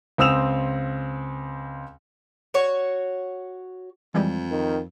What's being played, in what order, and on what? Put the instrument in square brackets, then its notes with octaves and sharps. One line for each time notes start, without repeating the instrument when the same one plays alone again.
[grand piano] C#2 C4 D#6 E6 E7 F7
[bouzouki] F#4 C#5
[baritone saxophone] F2 [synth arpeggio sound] E3 G3 G#3
[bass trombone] D#3